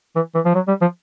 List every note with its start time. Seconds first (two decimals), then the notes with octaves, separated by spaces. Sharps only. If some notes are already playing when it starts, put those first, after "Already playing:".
0.16 E3
0.35 E3
0.45 F3
0.55 F#3
0.68 G3
0.81 F3